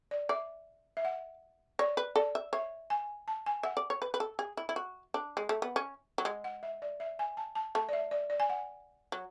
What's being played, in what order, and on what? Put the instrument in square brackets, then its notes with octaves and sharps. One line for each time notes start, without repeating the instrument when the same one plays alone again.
[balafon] D5
[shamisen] D5 [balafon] E5
[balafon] E5
F#5
[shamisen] C#5 [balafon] D5
[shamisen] B4
[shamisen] A4 [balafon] D5
[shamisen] E5
[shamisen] C#5 [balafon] E5
[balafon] G#5
A5
G#5
[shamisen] E5 [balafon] F#5
[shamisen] D5
C#5
B4
B4
A4
G#4
E4
E4
F#4
D4
G#3
A3
B3
C#4
F#3
[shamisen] G#3 [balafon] F#5
[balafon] F#5
E5
D5
E5
G#5
A5
A5
[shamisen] A3 [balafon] A5
[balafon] D5
E5
D5
D5
G#5
F#5
[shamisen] F#3